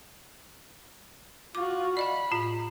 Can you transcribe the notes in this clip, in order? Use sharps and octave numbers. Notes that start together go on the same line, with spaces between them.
F4 F#4 D6
D5 D#5 F#5 B5
A2 F4